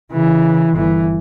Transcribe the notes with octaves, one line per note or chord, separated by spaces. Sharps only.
C#3 E3
G1 E3